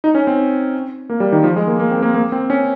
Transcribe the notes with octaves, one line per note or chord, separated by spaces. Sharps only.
D#4
C#4
C4
A#3
G3
D#3
F3
G#3
A#3
A#3
C4
A#3
A#3
C4
C#4